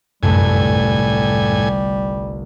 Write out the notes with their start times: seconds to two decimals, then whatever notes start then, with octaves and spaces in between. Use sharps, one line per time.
0.23 G1 C2 F#2 A2 G3 A3 G#5